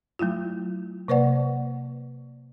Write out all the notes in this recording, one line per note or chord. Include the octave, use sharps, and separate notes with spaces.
F#3 A3 E4 F4
C3 A#3 B4 C5 D5 F#5